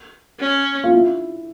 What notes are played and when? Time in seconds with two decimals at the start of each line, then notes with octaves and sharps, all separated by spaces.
0.40 C#4
0.84 F4
0.93 E4